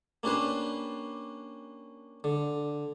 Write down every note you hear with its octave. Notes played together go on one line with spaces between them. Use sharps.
A#3 C#4 D4 G4 B4 C5
D3